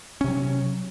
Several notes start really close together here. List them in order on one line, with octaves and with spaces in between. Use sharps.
C#4 C3 F#3